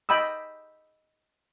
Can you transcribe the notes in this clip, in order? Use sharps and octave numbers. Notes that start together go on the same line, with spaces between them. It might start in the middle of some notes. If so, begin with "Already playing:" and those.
D#5 G5 B5 D#6 E6